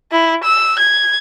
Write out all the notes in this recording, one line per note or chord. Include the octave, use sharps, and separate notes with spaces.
E4
E6
G#6